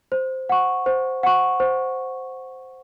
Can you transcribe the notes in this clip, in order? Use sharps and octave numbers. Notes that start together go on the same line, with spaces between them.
C5
F#5 C#6
C5
F#5 C#6
C5